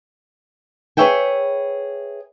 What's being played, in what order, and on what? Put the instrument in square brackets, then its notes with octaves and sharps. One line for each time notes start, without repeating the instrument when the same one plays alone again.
[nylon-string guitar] G#4 B4 C#5 E5 G5 G#5